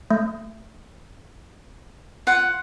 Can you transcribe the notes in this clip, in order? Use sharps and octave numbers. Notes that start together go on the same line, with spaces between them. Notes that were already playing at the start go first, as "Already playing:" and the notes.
A3
F4 F#5